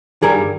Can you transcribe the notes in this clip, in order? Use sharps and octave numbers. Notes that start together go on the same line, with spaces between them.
G2 D#3 G3 G#4 A#4